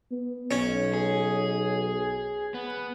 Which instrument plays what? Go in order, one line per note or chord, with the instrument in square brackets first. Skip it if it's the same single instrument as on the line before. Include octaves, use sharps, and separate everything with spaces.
[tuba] B3
[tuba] B1 [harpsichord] C#4
[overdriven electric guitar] G#4
B3